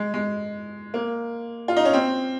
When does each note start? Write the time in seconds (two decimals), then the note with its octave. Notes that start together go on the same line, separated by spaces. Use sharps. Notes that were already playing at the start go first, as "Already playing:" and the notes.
Already playing: G#3
0.14 G#3
0.94 A#3
1.68 F4
1.76 D#4
1.85 C#4
1.93 C4